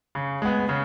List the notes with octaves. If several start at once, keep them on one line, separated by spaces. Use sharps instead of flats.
C#3
G#3 B3
C#3